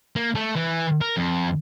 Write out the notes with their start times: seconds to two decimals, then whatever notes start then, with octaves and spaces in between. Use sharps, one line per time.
0.16 A#3
0.35 A3
0.56 E3
1.01 A#4
1.17 F2